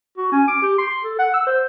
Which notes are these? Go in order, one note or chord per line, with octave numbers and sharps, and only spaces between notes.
F#4
C#4
D6
G4
C6
A4
F#5
E6
C5